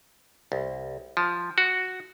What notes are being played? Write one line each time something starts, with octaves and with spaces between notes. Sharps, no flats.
C2
F3
F#4